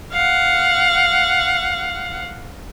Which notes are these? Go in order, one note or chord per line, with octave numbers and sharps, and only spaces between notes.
F5 F#5